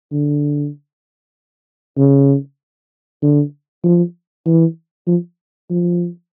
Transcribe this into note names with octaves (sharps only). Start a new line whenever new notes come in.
D3
C#3
D3
F3
E3
F3
F3